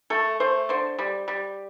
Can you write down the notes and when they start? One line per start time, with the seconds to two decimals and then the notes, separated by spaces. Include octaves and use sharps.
0.10 A3 A4
0.40 A3 C5
0.69 D3 C5
0.99 G3
1.28 G3